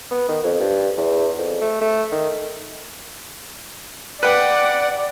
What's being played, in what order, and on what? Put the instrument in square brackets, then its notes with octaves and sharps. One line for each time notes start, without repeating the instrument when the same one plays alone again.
[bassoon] B3
D#3
F2
G2
E2
F2
A3
A3
D#3
[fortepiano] B4 G5 [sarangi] D5 [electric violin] F#5 D6